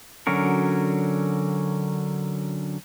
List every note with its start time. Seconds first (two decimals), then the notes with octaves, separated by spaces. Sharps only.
0.27 D3 F#3 C#4 F#4 A#4